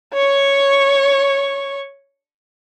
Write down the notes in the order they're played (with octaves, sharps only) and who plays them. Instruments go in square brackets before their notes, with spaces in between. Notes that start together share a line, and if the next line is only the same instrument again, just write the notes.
[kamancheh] C#5 C#6